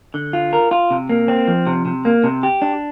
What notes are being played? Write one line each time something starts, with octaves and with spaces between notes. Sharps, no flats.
D3
F4
A#4
F4
C3
A#3
C4
F3
C3
C3
A#3
C3
G4
D4